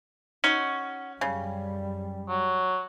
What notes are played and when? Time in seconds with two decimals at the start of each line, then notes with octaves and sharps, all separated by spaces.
0.44 C#4 D#4 F#4
1.21 F#2 C#3 G3
2.29 F#3